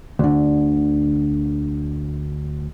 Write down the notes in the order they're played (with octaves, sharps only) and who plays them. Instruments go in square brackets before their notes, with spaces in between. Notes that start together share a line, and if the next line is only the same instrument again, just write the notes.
[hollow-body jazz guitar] D2 D3